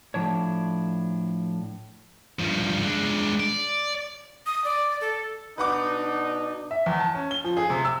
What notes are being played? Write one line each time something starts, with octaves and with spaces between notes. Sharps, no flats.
A2 F3 D4 C#5
G2 F3
G#3 D4
D5
D#6
D5
A4
B2 D4 D#4 B4 F#5 D6
E5
E2
A5
C#4
G7
F3
G#4
C3
E6